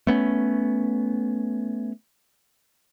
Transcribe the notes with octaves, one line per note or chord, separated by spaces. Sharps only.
A3 B3 C#4